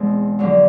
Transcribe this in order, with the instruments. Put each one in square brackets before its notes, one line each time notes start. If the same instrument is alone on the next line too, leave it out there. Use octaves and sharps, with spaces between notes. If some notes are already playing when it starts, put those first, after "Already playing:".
Already playing: [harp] E2 B2 G#3 C4
F2 D3 F#3